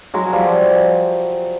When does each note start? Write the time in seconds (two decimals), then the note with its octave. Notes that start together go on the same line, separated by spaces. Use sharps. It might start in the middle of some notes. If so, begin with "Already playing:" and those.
0.14 F#3 G#3
0.33 F3 G3